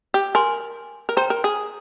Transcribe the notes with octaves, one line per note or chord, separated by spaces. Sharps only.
G4
A#4 G#5 C6
A#4
C5 G5 A#5
A#4
G#4